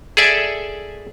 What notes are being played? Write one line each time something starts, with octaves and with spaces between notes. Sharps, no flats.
G#4 A4 D5 E5